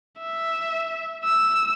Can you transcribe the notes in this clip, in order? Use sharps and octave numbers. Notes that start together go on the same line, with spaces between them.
E5
E6